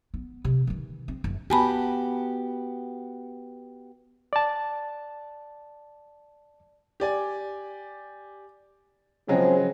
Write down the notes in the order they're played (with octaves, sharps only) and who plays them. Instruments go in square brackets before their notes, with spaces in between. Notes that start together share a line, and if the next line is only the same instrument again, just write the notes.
[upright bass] B3
C3
D#3 E3
C4
F#1
[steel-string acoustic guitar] B3 F#4 G4 [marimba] G#5 A5 B5
[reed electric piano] D5 A5
[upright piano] G4 D5 G#5
[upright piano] C#3 F#3 G#3 [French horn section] F3 C4 G#4